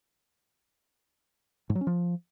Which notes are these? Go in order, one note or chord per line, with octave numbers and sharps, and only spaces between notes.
G#2
F#3
C#4
F3